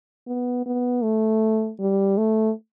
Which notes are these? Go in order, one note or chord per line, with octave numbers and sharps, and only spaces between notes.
B3
B3
A3
G3
A3